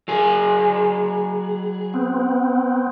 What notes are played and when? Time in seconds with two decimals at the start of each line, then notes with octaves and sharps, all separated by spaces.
0.08 F#3 G#4
1.94 B3 C4